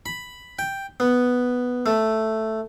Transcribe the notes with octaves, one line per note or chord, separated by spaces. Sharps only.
B5
G5
B3
A3